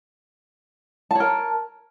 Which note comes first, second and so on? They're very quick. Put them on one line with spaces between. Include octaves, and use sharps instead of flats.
A5 C#5 A#4